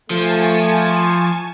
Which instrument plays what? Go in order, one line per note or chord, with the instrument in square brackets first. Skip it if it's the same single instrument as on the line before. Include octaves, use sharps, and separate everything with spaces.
[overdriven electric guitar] F3 [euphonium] A3 [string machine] G#5 A5 C#6